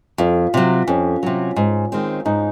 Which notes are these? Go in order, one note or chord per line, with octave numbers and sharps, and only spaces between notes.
F2 F4
C3 F#3
F2 C#4
C3 F#3
G#2
D#3 G#3 C4
G#2 D#4